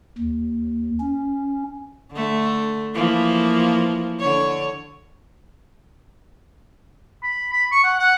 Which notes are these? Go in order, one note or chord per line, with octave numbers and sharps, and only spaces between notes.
D#2
C#4
D3 A3
E3 F3 A#3
D3 C#5
B5
B5
C#6
F#5
F#5